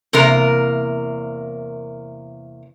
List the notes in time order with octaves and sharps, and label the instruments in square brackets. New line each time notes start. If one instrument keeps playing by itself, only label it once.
[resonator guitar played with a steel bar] E2 C3 A#3 A#4